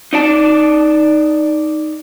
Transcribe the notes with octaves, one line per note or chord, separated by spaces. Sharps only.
D#4 D5 A5